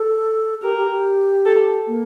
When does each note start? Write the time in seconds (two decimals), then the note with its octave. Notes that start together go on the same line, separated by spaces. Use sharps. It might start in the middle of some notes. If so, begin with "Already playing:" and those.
Already playing: A4
0.62 G4 A#4
0.77 G4
0.91 G4
1.46 A4
1.87 A#3